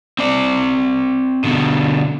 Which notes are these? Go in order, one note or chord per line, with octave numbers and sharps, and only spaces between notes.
C4 D5
B2 D3